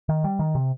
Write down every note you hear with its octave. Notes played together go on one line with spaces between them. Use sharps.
D#3
G3
D#3
C3